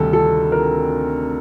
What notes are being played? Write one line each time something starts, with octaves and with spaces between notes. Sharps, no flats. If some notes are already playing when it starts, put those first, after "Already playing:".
Already playing: D2 C3 D#3 G3 A4
A4
A#4